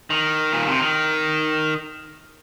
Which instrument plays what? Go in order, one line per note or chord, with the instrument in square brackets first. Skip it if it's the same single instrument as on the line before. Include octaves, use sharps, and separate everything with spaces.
[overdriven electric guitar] D#3
A#2
C3
D#3